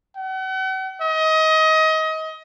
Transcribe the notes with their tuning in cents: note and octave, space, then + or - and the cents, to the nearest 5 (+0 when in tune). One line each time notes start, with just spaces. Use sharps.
F#5 +40
D#5 +25